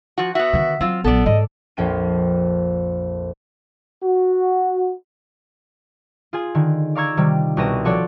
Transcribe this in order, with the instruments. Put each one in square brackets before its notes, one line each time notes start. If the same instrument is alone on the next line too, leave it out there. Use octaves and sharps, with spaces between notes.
[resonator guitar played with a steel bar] F3 F#4
[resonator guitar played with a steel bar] B3 F#4 [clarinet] E5
[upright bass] D3 D#3
[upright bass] F#3 [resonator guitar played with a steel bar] C4 F4
[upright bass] A#1 F#3 [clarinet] B3 [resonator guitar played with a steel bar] A4 D5
[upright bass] G#2 G#3 [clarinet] D#5
[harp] A#1 F2 G5 G#6 D#7
[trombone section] F#4
[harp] F4 G#4 G#5
D3 D#3
D5 F5 A#5 C#6 E6 G#6
C3 D#3 G3
C2 B2 C4 A#6 D#7 E7
F3 F#4 A4 C#5 D5